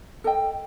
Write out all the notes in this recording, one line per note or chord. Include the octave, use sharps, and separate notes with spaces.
A4 D#5 G5